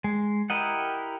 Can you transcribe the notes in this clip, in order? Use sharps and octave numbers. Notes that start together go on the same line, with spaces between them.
G#3
E4 G4 A#4 D#5 F#5